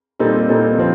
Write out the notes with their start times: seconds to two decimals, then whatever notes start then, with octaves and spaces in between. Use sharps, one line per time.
0.19 A#2 G3 C4 D#4 A4
0.49 A#2 G3 C4 D#4 A4
0.78 F3 C4 F4